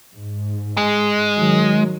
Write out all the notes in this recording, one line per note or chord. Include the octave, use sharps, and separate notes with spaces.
G#2
G#3
D#3 F#3